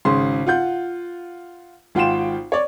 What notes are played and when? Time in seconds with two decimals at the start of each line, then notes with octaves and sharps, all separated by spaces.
0.05 G#1 C#3 C#4 C6
0.47 F4 F#5 G6
1.95 G#1 F4 F#5 G5 C6 E7
2.52 C#5 D5